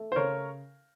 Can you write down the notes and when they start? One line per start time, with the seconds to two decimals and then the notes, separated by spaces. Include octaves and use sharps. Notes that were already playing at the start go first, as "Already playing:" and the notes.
Already playing: A3
0.12 C5
0.16 C#3 A#4 C#5